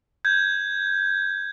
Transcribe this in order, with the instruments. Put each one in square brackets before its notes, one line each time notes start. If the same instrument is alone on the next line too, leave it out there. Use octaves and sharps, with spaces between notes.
[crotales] G6 G#6